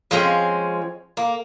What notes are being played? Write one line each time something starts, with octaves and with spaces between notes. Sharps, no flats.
F3 G#3 C4 C#4
A#3